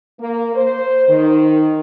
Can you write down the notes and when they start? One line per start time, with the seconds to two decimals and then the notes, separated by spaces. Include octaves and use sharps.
0.20 A#3
0.55 C5
1.08 D#3